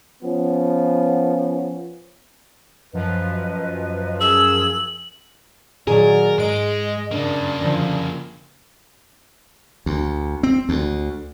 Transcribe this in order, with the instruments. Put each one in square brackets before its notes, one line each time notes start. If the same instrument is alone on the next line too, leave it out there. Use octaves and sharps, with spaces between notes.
[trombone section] F3 B3 C#4
[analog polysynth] F#2 F3 [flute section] B4 D#5
[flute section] C#4 G#4 A#4 [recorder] E6 [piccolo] F#7
[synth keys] A#2 D#3 F#3 [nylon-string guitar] G#4 [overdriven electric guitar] A#4 [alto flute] D5
[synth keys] G#2 D7 [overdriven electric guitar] G#3 [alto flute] D#5
[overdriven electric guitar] C#3 A#3 [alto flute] D4
[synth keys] D3 F3
[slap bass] D2
C4
D2